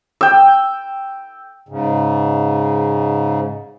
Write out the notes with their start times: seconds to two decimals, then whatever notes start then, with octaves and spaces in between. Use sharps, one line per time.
0.21 G5 E6
1.69 G#2 C#3